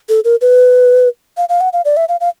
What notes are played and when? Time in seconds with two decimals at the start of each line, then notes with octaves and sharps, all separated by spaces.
0.09 A4
0.25 A#4
0.41 B4
1.37 F5
1.49 F5
1.61 F#5
1.73 F5
1.85 D5
1.97 E5
2.09 F5
2.21 F5